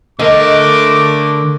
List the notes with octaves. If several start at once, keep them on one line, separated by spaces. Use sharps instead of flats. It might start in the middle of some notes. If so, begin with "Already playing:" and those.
D3 A3 A#4 D#5 D6